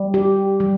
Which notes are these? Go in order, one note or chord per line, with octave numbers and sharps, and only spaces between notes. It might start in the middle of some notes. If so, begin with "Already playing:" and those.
Already playing: G3
G4
G3